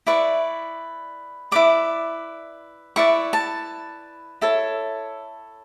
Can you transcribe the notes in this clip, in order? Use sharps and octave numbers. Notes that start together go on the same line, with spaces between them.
E4 B4 D5 C#6
E4 B4 D5 D6
E4 B4 D5 C#6
A5
E4 A4 C#5